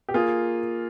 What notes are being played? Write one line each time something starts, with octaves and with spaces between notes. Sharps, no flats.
G4
A#3 F4 G#4